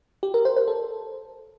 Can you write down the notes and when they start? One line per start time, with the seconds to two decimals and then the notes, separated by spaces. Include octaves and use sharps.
0.23 G4
0.34 A#4
0.45 C5
0.56 C5
0.68 A4